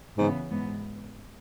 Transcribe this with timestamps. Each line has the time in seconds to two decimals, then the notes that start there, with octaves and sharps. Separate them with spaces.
0.17 G#2 C#3 E3 B3
0.50 G#2 E3 B3